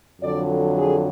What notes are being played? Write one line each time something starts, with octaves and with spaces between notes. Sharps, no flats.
F2 D3 F#3 D5
G#4